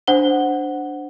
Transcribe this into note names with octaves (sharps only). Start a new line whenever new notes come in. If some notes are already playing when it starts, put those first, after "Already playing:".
D4 C5 F#5 G7